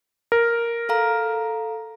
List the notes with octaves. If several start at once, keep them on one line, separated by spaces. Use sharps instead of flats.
A#4
A4 F5 A#5